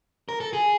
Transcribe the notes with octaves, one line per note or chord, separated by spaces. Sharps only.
A#4
A4
G#4